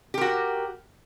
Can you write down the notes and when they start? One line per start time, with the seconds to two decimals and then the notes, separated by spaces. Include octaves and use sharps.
0.14 G4
0.18 A#4
0.21 F#4